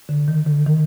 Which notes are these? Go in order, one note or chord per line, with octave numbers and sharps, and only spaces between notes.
D3
D#3
D3
D#3